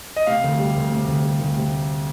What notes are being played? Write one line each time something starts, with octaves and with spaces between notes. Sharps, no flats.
D#5
C3 F5
D2
G3
D2
C3
D2
G3
D2
C3